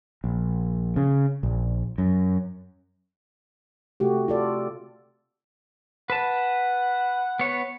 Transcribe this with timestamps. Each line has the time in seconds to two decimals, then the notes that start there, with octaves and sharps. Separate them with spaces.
0.24 A#1
0.96 C#3
1.43 A#1
1.98 F#2
4.00 C3 A3 F#4 G4
4.28 F4 A4 D5
6.10 B4 F#5 A5
7.40 B3 C#5